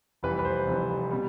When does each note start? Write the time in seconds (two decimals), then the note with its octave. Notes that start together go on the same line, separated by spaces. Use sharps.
0.23 F1 F2 E3 G3 B4
0.39 B4
0.45 C5
0.66 F1 F2 E3 G3
1.11 B2 G3